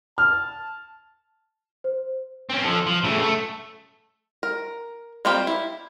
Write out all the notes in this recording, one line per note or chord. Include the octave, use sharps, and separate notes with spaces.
A5 F6
C5
C4 C#4
F3 A4
F3
C#3 A3
A3
A#4
G3 A#3 C4 F4 G4
E4